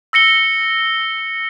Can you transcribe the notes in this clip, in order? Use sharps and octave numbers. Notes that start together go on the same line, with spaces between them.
E6 A#6 C#7 G7